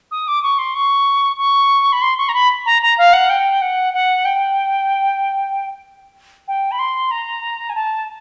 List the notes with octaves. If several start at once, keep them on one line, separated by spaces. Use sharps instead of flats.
D#6
D6
C#6
C6
C#6
C#6
B5
C6
C#6
A#5
B5
A#5
A#5
F5
F#5
G5
F#5
F#5
G5
G5
B5
C6
A#5
G#5
A5